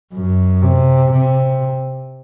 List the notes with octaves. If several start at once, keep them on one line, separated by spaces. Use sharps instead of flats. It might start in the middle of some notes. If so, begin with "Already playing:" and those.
F#2
C3
C3